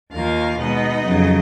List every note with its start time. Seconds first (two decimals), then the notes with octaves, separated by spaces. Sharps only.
0.11 D#2 D#3 A#3 D#4 F4 F5
0.58 B2 G#3 B3 D#4 D#5
1.05 F2 C#3 F#3